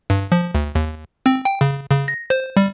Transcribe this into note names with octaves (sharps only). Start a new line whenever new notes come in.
G2
F3
D2
D#2
C4
G5
C#3
C#3
A#6
C5
G3